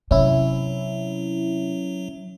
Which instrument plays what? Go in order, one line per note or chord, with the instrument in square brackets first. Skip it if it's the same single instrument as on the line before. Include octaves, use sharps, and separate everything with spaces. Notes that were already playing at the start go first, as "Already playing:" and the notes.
[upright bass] C3 [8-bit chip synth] F#3 [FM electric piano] C#4 E4